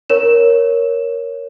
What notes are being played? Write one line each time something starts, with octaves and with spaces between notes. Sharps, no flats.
A#4 C#5 E7